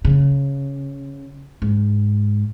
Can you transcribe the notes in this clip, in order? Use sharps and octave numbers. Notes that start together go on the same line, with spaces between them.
C#3
G#2